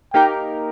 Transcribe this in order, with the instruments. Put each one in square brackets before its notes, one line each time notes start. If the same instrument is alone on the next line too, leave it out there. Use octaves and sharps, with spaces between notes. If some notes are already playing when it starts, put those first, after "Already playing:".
[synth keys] A#3 D#4 G4 A#4 [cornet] G5